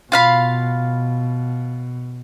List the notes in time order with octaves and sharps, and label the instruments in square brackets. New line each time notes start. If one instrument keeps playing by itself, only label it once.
[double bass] B2 [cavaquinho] F4 F5 B5